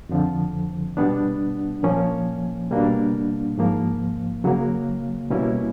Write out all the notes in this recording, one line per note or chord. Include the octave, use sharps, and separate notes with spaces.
F2 D3 F3
B2 G3 B3 D4
A#2 F3 A#3 C#4
B2 G3 A#3 D4
G#2 F3 A#3
C#3 F#3 A#3
B2 G3 A#3 C#4 E4